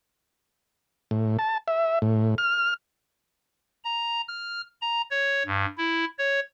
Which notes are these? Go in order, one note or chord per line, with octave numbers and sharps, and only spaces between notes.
A2
A5
E5
A2
F6
A#5
F6
A#5
C#5
G2
E4
C#5